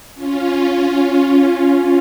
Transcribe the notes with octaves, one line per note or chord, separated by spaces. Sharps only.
C#4 F4